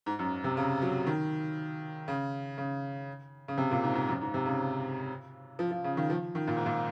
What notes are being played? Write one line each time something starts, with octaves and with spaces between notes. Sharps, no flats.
G#2
F#2
C3
C#3
F#3
D#3
C#3
C#3
C#3
C3
A#2
G#2
G#2
F#2
G#2
C3
C#3
F3
F3
C#3
D#3
F3
D#3
A#2
G#2
A#2